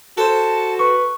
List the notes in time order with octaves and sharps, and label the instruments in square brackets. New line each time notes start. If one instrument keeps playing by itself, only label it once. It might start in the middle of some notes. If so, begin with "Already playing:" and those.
[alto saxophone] F#4 [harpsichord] A4 C5 [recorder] A5
[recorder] B4 [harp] C#6